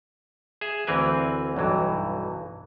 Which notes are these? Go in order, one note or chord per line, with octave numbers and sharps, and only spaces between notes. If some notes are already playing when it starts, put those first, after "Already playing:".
G#4 E5
D2 E3 C4 A#4 B4 G#5
B1 G2 E3 F#3